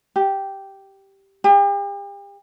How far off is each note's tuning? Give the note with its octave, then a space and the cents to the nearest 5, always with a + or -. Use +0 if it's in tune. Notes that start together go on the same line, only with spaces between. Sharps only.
G4 -5
G4 +40